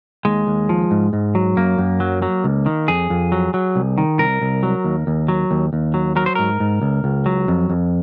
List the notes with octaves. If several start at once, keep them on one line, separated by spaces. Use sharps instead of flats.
D#2 G#3
D#2
F3
G#2
G#2
F#3
F#2 A#3
F#2
F#3
F#3
C#2
D#3
F2 G#4
F2
F#3
F#3
C2
D#3
C2 A#4
C2
F#3
D#2
D#2
F#3
D#2
D#2
F#3
F#3 A#4
C5
G#2 A#4
G#2
C#2
C#2
F#3
F2
F2